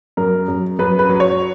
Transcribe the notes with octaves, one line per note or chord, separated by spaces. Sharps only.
F#2 A#4
F#2
F#2 B4
B4
F#3
C#5